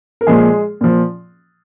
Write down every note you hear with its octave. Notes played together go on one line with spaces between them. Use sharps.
A#4
A#2 F3 G#3 G#4
A#2 F3